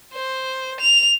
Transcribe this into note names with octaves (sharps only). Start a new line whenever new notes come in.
C5
F7